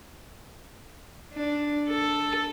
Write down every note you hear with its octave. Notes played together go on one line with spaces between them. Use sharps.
D4
A4